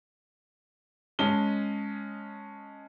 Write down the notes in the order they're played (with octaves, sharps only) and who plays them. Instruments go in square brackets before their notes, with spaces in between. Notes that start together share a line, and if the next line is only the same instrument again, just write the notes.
[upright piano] G#3 C#4 D#5 A5 G7